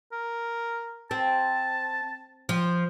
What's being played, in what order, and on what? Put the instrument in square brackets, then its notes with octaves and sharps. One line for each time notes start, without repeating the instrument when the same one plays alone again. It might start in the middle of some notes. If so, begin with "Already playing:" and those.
[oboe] A#4
[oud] C4 [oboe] A5
[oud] F3